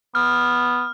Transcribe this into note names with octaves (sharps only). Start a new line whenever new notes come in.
B3 F6